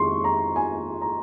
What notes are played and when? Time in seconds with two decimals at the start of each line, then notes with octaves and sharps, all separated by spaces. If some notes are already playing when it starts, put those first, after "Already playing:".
Already playing: F2 D#3 G#3 C6 C#6
0.24 A#5
0.56 G#5
1.01 A#5